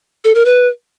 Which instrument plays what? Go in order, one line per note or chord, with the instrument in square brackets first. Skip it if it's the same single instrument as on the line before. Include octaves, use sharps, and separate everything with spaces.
[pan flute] A4
A#4
B4